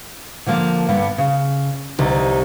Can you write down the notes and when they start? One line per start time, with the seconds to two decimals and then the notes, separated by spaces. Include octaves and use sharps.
0.46 D3 F3 A#3
0.88 G2 D3 B3
1.18 C#3
1.99 C2 D#4